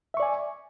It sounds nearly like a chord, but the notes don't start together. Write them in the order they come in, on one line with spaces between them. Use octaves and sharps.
E5 C#6 D5 G#5